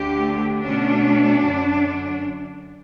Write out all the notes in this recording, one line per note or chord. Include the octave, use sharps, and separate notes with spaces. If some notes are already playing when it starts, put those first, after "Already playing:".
Already playing: D2 D3 A3 D4 G4
B2 A3 C#4 D4
F#2 D3 F#3 C#4